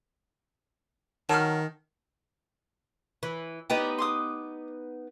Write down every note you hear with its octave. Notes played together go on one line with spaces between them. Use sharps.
D#3 F#3 A5 F6
E3
B3 D#4 G4 D5
C6 D6 D#6